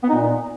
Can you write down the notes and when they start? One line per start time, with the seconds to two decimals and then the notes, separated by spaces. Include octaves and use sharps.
0.03 B3
0.09 D#4
0.15 A#2